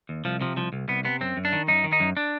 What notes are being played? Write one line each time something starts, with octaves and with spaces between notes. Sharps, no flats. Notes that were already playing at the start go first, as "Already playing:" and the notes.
D#2
C2 F3
C3 F3
C2 F3
C2
C2 B3
C3 B3
F#2 C4
F#2
D4
D#3
F#2 D#4
D#3
D#4
F#2
D4